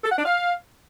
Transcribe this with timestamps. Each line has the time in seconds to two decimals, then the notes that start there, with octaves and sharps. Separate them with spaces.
0.04 A4
0.11 F#5
0.18 D4
0.25 F5